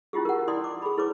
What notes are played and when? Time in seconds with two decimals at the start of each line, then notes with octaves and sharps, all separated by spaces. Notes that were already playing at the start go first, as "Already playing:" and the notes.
0.13 C#4 E4 F4 G4 G#4
0.25 A#4 F#5
0.48 E4 D5 G#5 C6 D#6
0.64 D6
0.82 G#4 B5
0.97 E4 G#4 B4 C#5 D6